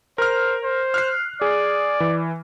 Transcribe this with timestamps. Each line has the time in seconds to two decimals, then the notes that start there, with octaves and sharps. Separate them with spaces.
0.18 A#4 C5 F6
0.63 C5
0.94 F6 F#6 C7
1.41 G#4 D5
2.00 E3